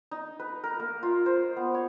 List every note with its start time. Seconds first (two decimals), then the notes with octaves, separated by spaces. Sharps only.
0.11 D#4
0.39 B4
0.64 A#4
0.79 A#3
1.03 F4
1.26 C5
1.56 B3
1.74 C#5